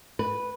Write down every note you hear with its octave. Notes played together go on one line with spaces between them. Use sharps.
B4